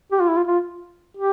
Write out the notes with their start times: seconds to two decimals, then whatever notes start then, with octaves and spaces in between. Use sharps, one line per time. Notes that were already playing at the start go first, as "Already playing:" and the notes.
0.12 G4
0.21 F4
0.28 E4
0.37 F4
0.48 F4
1.17 G4